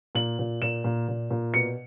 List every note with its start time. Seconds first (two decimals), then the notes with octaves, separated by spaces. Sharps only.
0.15 A#2 F#7
0.39 A#2
0.62 A#2 E7
0.84 A#2
1.08 A#2
1.31 A#2
1.54 B2 C#7